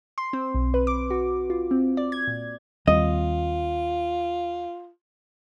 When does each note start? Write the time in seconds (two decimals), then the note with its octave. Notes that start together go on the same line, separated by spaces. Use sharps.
0.18 C6
0.33 C4
0.55 B1
0.74 B4
0.87 D6
1.10 F#4
1.50 F4
1.71 C4
1.97 D5
2.12 G#6
2.27 A#2
2.88 D#2 G3 C4 F4 D#5